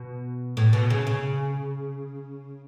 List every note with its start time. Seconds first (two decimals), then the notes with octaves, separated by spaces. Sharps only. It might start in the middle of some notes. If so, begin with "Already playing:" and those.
Already playing: B2
0.57 A2
0.73 B2
0.90 C#3
1.07 C#3